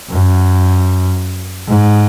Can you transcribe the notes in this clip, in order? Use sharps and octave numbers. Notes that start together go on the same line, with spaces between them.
F#2
G#2